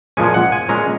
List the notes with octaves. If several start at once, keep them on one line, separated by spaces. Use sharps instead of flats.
A#2 F3 G#3 C#4 G#5
F#5
G#5
A#2 G#3 C#4 A#5